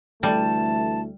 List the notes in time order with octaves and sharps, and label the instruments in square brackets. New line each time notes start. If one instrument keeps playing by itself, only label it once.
[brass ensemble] D2 E3 A3 [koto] G3 [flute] A5